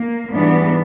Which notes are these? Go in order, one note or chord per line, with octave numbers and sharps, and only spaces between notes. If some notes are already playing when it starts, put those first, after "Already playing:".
Already playing: A#3
G#2 E3 G3 B3 D4